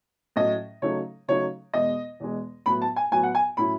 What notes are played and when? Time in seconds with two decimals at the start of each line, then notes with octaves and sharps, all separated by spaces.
0.36 A2 F#3 A3 C#4 D#5
0.82 C#3 F#3 A3 D#4 C#5
1.28 C#3 F#3 A3 D#4 C#5
1.74 E2 B2 G#3 D#5
2.20 E2 B2 G#3
2.66 A2 F#3 B3 B5
2.82 A5
2.96 G#5
3.12 A2 F#3 B3 G#5
3.23 F#5
3.35 G#5
3.57 A2 F#3 C#4 E4 B5